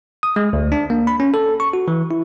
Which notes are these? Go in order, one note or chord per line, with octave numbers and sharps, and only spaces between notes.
D#6
G#3
D2
D4
A#3
B5
C#4
A4
C#6
F#4
E3
E4